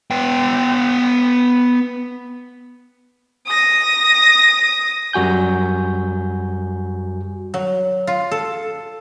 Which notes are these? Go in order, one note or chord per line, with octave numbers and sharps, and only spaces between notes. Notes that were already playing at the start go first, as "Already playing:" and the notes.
B3 G5
D#6 A#6
F#2 G3 F#4 G#5 G6
F#3
F4
A4